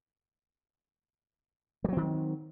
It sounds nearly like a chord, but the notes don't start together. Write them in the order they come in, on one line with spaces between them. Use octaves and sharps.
G3 F#3 C4 D#3